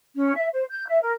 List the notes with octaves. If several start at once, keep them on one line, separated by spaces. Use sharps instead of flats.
C#4
E5
C5
G6
E5
A#4